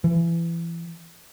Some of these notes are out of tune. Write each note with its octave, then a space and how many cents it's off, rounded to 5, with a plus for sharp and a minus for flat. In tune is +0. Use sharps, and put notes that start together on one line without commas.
E3 +30